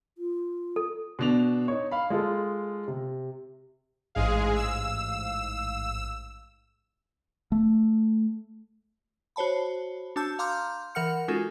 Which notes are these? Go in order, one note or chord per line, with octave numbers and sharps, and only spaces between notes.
F4
A4
B2 D4 F7
D#4 C#5
F5 B5
G#3 F4 A4
C3
A1 G#2 G#3 G#4 F5
E6
A3
F#4 C5 C#5 A5 B5
D4 F#4 A5 E6 G6
F5 A#5 C6 D6 F6 G6
E3 A#4 F#5 F6 C#7
G#3 C#4 D#4 F4 F#4 A4